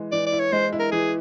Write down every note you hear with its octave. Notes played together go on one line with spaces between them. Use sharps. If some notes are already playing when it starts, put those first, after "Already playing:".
Already playing: E3 G#3
E3 D5
D5
E4
C#5
G#3 C5
E4
A#4
E3 G#4